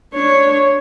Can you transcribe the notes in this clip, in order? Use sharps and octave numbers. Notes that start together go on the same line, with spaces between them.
D4 C#5